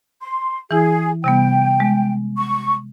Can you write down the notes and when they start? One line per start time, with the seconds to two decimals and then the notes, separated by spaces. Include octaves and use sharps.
0.22 C6
0.71 E3 E4 G#4
1.24 C3 G3 B3 G5
1.80 G#3
2.37 C#6